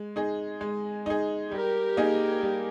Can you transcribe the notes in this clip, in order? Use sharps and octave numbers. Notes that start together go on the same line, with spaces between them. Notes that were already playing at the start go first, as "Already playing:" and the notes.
Already playing: G#3
D#4 G#4
G#3
D#4 G#4
G3 G4 A#4
A#3 D#4 G#4
G3